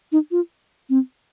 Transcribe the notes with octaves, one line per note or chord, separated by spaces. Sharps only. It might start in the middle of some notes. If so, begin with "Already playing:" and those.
D#4
F4
C4